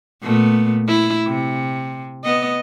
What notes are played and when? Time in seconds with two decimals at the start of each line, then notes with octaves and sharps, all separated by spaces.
0.22 A#2 A3 B3
0.87 E4
1.27 C3
2.23 B3 D#5